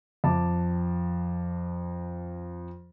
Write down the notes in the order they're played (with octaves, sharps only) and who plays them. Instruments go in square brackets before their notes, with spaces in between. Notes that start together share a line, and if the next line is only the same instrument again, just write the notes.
[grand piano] F2 A5 D6